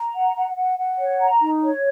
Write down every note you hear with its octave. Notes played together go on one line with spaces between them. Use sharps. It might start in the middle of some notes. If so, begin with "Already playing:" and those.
Already playing: A#5
F#5
F#5
F#5
F#5
C#5
A#5
D#4
C#5